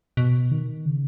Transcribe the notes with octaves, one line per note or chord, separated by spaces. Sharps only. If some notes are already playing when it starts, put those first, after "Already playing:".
B2
D#3
C#3